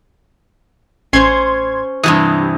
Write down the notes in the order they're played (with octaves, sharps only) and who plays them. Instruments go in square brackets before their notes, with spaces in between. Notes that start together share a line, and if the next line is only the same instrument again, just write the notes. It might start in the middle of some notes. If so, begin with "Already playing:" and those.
[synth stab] A1 C6 G#6 [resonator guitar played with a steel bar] C#4 C5
[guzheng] G2 C3 E3 [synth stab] D#6